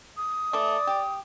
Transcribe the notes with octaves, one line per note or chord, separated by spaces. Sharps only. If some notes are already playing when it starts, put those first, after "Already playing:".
D#6
E3 A3 D5
G4